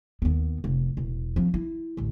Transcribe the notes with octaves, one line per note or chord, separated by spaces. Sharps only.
D#2 B3
F1
E1
F3 C4
E4
A1 D2